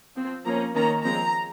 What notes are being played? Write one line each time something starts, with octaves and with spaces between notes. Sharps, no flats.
F3 C4
F3 A#3 C#4 A#5
D#3 A#3 C#4 A#5
F3 G#3 C4 A#5